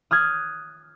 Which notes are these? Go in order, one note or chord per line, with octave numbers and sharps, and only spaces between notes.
D#6 F6 F#6 G#6 A6